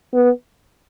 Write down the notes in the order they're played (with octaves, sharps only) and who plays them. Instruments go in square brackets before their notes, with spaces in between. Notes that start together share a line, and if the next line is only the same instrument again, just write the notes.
[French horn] B3